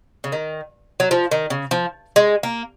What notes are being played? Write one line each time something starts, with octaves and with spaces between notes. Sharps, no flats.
C#3
D#3
F#3
F3
D#3
C#3
F3
G#3
A#3